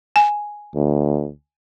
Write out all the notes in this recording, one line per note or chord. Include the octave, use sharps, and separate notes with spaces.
G#5
D2